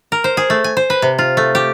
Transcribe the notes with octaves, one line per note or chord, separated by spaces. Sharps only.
A#4
C5
G#4
A3
G#5
C5
B4
C3
F4
A3
G4